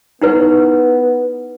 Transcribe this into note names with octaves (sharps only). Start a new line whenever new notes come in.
B3 D#4 E4 B4